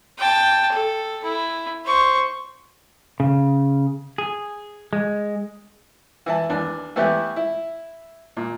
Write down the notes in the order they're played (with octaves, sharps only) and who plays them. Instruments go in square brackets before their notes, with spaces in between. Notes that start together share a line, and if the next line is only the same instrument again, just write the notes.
[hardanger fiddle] G5 A5
A4
E4
C5 C#6
[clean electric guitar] C#3
G#4
G#3
[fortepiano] E3 E4 A5
D#2 E3 D4
E3 A3 B3 E4 G4
E4
A#2